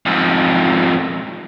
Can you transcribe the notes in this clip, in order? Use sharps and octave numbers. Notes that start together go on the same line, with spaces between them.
F2 G#2